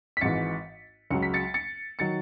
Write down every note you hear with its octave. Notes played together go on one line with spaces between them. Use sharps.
B6
G#1 G#2 E3 A6 C#7
C#2 C#3 F#3 C#7
B6
A6 C#7
A6 C#7
D#3 F#3 A6 C#7